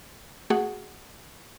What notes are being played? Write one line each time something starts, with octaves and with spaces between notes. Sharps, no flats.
A3 F#4 G#4 F#5